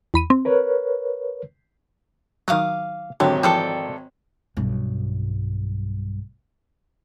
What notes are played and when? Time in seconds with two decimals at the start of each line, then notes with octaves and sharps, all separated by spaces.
0.14 E2 B5 D#7
0.30 C4
0.45 A#4 B4 C#5
2.48 D#3 F#3 F5 D6 D#6
3.20 G#1 D3 F#3 G4 C#5
3.43 E3 F3 A4 C5 D5 G5
4.57 B1 G2